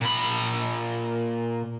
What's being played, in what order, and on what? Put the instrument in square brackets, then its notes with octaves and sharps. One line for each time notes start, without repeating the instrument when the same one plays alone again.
[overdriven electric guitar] A#2 B5